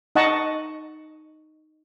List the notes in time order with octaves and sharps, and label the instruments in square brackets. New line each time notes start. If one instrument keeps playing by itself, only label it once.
[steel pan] D#4 D#5 F#5 A5 C#6